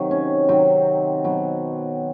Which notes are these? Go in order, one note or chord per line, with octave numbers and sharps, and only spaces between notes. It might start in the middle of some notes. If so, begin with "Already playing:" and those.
Already playing: C3 D#3 F#3
C#4
C3 D#3 F#3 C4
B2 F#3